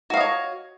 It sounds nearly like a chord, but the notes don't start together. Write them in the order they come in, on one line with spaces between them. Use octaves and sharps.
F#4 F5 D#5 C#5